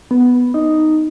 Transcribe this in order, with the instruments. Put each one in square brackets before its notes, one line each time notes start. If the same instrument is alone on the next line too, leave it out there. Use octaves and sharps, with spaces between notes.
[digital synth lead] B3
D#4